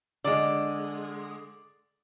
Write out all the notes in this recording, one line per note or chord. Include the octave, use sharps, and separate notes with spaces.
D3 G#3 D5